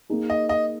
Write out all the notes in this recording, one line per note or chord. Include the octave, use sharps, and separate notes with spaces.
A#3 D#4 G#4
D#5
D#5